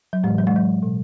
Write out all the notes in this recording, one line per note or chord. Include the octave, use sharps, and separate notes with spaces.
F#3
A2 E3 G#3
F#3
G#3
F#3
B2